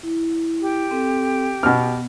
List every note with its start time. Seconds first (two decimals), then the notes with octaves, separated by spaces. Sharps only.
0.03 E4
0.60 G4
0.91 C4 A4
1.63 B2 B3 F6